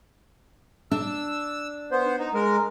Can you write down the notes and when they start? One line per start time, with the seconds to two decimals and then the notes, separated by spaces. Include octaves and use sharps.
0.91 D4 E6
1.92 B3 C5
2.19 D#4
2.34 G#3 A#4